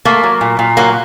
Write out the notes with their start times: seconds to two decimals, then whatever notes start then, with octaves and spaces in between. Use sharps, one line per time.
0.05 A3 A#3
0.23 F#3
0.41 A#2
0.59 A#2
0.77 F#3 A#3